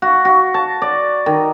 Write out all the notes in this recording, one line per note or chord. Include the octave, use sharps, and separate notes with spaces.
F#4
F#4
A5
D5
D#3